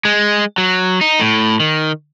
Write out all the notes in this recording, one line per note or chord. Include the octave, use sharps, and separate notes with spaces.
G#3
F#3
D#4
A2
D#3